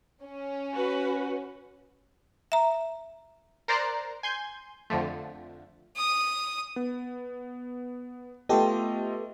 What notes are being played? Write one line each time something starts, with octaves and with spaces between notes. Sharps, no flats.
C#4
F#4 B4
E5 A#5
A#4 C5 D5 A#5 C6 F#6
G#5 C6 G6
F2 D3 F3 A3
D#6
B3
A3 B3 F4 G4 A4 D#5